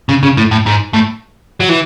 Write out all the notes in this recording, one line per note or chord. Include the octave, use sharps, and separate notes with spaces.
C#3
C#3
A2
A2
G#2
A2
F#3
E3